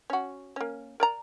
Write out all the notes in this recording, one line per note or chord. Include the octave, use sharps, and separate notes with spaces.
C#4 F#4
A#3 C#4
A#4 D5 A#5